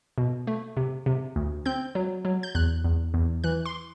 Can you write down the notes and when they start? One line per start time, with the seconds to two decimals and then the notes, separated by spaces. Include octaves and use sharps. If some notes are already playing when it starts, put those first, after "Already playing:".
0.18 B2
0.47 A3
0.77 C3
1.06 C3
1.36 D2
1.66 C4 G6
1.95 F#3
2.25 F#3
2.43 G6
2.55 E2 F#6
2.85 E2
3.14 E2
3.44 E3 F#6
3.66 C6